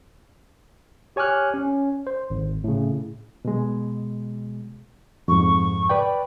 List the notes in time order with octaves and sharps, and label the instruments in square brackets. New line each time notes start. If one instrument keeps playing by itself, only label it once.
[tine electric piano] G4 C#5 G#5 D6 F6 F#6
C#4
C5
G#1
A2 C#3
[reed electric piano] B2 G#3
[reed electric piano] F2 G#2 [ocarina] C#6
[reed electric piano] B4 D5 G5